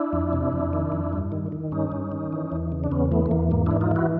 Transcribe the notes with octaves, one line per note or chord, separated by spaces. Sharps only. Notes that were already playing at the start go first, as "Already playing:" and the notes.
Already playing: D4 E4
F2
C3
F2
D#3
F2
G2
D#3
D#3
G2 C#4 D#4
G2
D#3
E3
E2
C#3
D4
E2 B3 C#4
E3 A3 B3
A3
E2 A#3
G#2 A#3
E3 D4 E4
D#4 F4
E3 E4 F#4